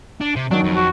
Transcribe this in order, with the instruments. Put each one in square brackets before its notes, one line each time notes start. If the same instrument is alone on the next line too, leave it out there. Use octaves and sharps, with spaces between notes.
[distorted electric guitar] D4
C3
[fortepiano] D#3 F#3 [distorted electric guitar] D4
[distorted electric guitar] F2
[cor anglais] F#4